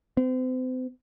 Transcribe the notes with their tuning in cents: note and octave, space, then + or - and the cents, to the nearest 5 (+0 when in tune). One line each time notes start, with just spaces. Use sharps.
C4 -40